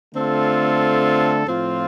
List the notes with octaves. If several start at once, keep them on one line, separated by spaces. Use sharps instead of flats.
D3 A3 C4 F4 A4
A2 F3 C4 F4